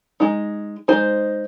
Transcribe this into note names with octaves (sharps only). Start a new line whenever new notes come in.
G#3 D#4
G#3 D#4 C5